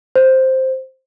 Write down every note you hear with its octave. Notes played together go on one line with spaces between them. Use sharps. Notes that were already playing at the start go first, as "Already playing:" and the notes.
C5